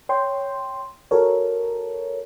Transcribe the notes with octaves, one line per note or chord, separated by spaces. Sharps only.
C#5 G5 C6
F#4 A4 A#4 C#5